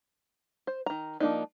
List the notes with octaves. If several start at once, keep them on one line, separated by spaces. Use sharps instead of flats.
C5
D#3 A#5
F3 A#3 D4 D#4